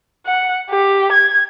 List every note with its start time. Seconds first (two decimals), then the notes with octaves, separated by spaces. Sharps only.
0.26 F#5
0.70 G4
1.13 G#6